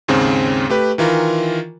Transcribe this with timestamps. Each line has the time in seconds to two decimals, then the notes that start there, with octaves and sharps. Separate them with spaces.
0.08 D#2 G#2 C#3 C4
0.70 A3 G4 B4
0.98 D#3 E3 F4 A#4